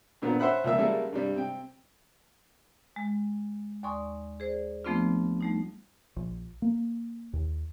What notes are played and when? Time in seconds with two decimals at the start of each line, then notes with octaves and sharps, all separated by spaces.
0.22 G2 A#2 D3 B3 C4
0.40 C#4 C5 E5 F#5 B5
0.64 C#2 F3 A#3 E5 E6
0.78 C#3 G3 G#3 A#3 E4 A4
1.13 G2 C3 G3
1.36 C3 G5
2.96 G#3
3.83 D#2 D5 G#5 C6 C#6 D#6
4.40 G#4 C5 D5
4.85 F3 A3 B3 C4 D4 F4
5.41 G3 A3 D#4
6.16 A#1
6.62 A#3
7.33 D#2